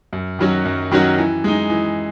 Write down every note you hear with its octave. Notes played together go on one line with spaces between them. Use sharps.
F#2
D#3 F#3 C#4 F#4
F#2
D#3 F#3 C#4 F#4
E3
G#3 D#4
E3